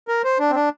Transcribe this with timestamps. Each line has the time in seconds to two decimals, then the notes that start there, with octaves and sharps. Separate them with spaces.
0.08 A#4
0.24 C5
0.39 D4
0.51 C4
0.55 D4